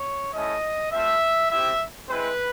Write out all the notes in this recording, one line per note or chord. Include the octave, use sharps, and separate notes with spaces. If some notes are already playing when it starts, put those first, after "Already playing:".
Already playing: C#5
A3 C#4 E4 D#5
A3 C4 F4 E5
C4 E4 G4 E5
G#3 C4 E4 B4